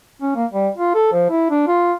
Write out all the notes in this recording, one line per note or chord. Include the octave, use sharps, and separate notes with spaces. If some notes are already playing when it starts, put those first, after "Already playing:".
C#4
A#3
G3
F4
A4
F3
E4
D4
F4